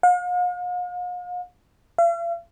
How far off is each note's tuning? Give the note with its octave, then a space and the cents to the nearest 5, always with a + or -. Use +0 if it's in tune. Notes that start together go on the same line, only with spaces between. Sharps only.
F5 +45
F5 -45